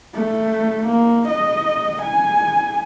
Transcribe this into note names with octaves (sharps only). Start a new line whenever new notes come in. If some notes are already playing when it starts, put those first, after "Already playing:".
A3
A#3
D#5
G#5